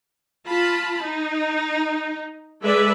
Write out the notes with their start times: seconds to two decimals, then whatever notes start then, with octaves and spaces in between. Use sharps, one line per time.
0.47 F4 A5 B5
1.04 D#4
2.63 G#3 A4 B4 D5 E5